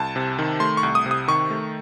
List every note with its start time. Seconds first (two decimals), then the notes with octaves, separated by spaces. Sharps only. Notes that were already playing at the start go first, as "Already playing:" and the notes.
Already playing: C2 A5
0.16 C3
0.39 D#3
0.60 A3 C6
0.77 C#6
0.83 C2
0.95 D#6
1.06 C3
1.11 D#6
1.28 D#3 C#6
1.50 A3